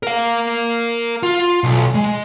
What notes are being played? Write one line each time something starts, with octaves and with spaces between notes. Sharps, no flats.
A#4 F5
F4
B1
G#3